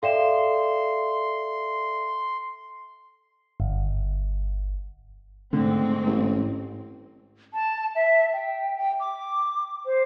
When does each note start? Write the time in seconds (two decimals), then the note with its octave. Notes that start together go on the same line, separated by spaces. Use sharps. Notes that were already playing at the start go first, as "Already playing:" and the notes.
0.03 A4 D5 E5 F5 G5 C6 E7
3.60 G1
5.53 G#2 D3 A3 C4
6.07 A1
7.54 A5
7.96 E5
8.34 G5
8.78 G5
9.00 D6
9.86 C5